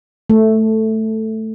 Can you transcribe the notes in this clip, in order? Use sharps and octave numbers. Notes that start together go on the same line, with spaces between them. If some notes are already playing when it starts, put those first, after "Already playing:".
A3